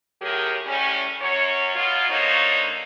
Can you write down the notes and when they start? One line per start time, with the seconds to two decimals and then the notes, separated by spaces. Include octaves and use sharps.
0.21 A2 F#3 G4 G#4 A#4
0.66 A2 G3 C#4
1.21 F#2 C#5
1.75 B2 F#3 F4
2.10 D3 A#3 D#4 C5 C#5